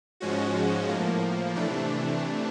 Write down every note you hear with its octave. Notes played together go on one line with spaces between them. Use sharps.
G#2 F3 G#3 C#4 F#4
A2 F3 A#3
C3 E3 A3 D4